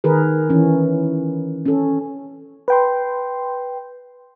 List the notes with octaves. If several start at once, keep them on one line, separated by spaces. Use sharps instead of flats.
D#3 G#4 A#4 B4
E3 C#4
C#4 A4
B4 G5 C6